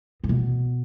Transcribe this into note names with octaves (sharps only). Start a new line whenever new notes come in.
A2
B2